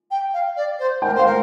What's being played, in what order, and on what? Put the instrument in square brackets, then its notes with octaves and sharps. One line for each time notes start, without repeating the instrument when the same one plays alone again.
[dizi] G5
F5
D5
C5
[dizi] A#4 [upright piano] G5
[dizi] C5 [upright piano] F5
[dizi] A#4